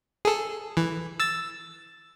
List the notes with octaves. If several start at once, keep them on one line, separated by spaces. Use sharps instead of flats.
G#4 A4
E3
E6 A6